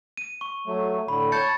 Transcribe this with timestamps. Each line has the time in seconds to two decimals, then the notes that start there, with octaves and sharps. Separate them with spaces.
0.17 D#7
0.41 C#6
0.67 F#3 A3
1.08 A2 D3 B5
1.32 C#5 A5 G6 A6 C#7